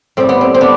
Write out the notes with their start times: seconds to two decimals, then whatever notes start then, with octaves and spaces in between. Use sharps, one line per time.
0.17 A2 G3 C4
0.29 B3
0.41 C4
0.54 C4
0.61 B3 D4